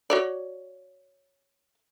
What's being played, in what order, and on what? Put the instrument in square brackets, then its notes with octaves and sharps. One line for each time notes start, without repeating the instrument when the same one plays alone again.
[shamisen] F#4 C#5 D5